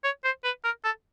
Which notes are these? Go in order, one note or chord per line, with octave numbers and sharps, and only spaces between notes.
C#5
C5
B4
A#4
A4